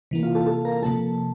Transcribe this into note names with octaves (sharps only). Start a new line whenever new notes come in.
C3 E3 A#3
F4 F5
A4 A5
A4 A5
A#4 A#5
C3 F3 A#3 A4 A5